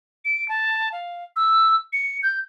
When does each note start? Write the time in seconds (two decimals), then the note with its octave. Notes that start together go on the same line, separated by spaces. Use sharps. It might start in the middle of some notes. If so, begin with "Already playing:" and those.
0.25 D7
0.49 A5
0.92 F5
1.36 E6
1.93 C#7
2.23 G6